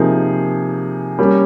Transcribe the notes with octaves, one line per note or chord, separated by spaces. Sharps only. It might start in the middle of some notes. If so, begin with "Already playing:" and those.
Already playing: C3 F3 A#3 D#4 G#4
G3 A#3 C#4 G4